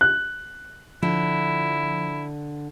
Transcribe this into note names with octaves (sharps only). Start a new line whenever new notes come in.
F#6
D3 F3 E4